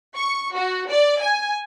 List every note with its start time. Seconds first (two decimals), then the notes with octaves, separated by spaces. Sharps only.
0.16 C#6
0.55 F#4
0.89 D5
1.21 G#5